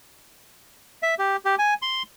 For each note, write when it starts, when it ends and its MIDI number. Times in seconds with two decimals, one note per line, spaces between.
1.03 1.15 76
1.19 1.36 67
1.45 1.55 67
1.59 1.74 80
1.82 2.03 84